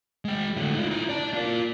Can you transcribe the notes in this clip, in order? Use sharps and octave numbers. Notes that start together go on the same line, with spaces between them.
G#3 G5
A2 D3
D#4 F4
E4 A#5
D5 A5
F4 A#4